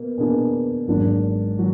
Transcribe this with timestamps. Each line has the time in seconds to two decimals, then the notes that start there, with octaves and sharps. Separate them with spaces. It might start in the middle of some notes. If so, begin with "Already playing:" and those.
Already playing: B2 A#3
0.18 B2 A#3 D4 G#4
0.88 G#1 G#2 F#3 A#3 D4
1.59 F#3